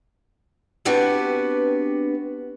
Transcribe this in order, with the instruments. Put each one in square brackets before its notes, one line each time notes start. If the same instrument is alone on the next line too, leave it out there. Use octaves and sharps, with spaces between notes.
[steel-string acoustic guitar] B3 C4 D4 F#4 G4 B4